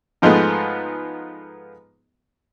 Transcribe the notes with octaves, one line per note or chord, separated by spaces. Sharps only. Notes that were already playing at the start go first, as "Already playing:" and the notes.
G#2 F3 G#3 A3 B3